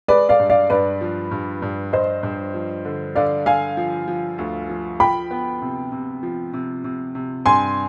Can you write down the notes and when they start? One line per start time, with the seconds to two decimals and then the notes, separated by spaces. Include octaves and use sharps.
0.08 G#3 B4 D5
0.29 D5 F5
0.39 G2
0.50 D5 F5
0.70 G2 B4 D5
1.01 F3
1.31 G2
1.62 G2
1.93 G2 C5 D#5
2.23 G2
2.54 F3
2.85 D3
3.15 D3 D5 F5
3.46 D3 F5 G#5
3.77 F3
4.08 F3
4.38 D2
4.70 F3
5.00 F3 G5 B5
5.31 B3
5.62 C3
5.92 C3
6.23 F3
6.53 C3
6.84 C3
7.15 C3
7.46 G2 G#5 C6